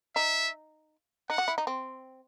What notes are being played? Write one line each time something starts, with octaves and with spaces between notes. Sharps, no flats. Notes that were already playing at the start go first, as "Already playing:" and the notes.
D#4 E5
D#4 F#5
F#4
E4
D#4
C4